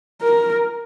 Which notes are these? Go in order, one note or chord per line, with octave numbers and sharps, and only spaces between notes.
A#4